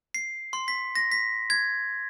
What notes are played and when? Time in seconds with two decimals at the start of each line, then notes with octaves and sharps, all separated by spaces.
0.14 C7
0.53 C6
0.68 B6
0.95 A#6
1.12 B6
1.50 G#6